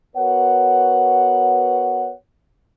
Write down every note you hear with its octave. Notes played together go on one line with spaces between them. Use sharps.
B3 F#4 A#4 B4 C#5 F#5